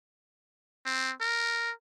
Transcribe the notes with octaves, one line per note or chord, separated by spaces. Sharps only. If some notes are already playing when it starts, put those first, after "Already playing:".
C4
A#4